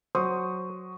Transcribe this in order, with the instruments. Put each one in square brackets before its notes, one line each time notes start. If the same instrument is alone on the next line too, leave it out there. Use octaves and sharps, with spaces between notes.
[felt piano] F#3 C#6 D#6 [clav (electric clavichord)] C5